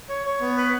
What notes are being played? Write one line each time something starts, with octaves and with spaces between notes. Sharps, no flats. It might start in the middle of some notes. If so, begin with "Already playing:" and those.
C#5
C#5
B3
B4